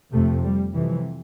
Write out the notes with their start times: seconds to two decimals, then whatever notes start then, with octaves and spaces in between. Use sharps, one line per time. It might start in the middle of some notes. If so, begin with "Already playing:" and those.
0.12 F2 C3 A3
0.43 G3
0.74 F2 C3 E3